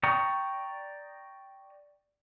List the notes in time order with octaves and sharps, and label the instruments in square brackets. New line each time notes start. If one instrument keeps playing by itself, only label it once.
[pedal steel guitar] D5 G5 A#5 C#6 D#6